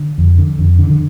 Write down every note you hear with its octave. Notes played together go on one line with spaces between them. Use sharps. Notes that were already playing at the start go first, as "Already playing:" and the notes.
Already playing: D3
F2
D3
F2
D3
D3